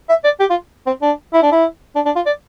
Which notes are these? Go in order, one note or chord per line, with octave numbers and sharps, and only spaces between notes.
E5
D5
G4
F4
C4
D4
E4
D4
E4
D4
D4
F4
D5